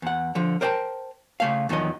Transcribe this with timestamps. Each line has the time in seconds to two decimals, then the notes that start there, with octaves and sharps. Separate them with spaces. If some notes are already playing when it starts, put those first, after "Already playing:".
0.02 E2 F#5
0.35 D3 F3
0.61 A#4 C5 D5 F#5 G5 A5
1.40 C#3 A3 F5
1.69 E2 D#3 F3 F#3 D#5